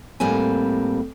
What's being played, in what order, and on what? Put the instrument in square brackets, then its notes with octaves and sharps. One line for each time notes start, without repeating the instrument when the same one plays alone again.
[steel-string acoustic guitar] A2 G3 A#3 C4 G#5